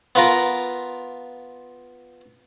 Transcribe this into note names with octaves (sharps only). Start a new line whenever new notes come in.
B3 F4 A#4